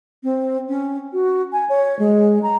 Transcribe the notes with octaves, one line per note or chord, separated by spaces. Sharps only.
C4
C#4
F#4
G#5
C#5
G#3
A#5